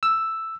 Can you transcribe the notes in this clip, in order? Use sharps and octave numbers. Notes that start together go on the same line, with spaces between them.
E6